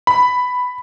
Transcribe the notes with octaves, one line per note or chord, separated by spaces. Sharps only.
B5